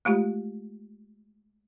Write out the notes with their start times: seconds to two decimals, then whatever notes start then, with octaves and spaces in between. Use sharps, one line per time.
0.05 G#3 A3 F4 G4